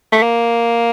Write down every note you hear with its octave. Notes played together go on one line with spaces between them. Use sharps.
A3
A#3